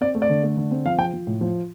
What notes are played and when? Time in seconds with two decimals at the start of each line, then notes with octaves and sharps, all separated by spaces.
0.01 C4 D5
0.15 A3
0.22 D5
0.30 D3
0.43 A3
0.57 D3
0.71 C4
0.86 F3 F5
0.98 F3 G5
1.13 F3
1.27 A2
1.41 F3